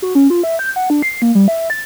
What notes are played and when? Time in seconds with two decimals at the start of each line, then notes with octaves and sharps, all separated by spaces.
0.02 F#4
0.15 C#4
0.30 F4
0.43 E5
0.59 G6
0.76 F#5
0.90 D4
1.02 C7
1.22 A#3
1.35 G3
1.48 E5
1.70 A6